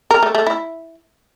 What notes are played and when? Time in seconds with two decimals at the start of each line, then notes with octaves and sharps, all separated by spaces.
0.11 A#4
0.23 A3
0.35 A3
0.47 E4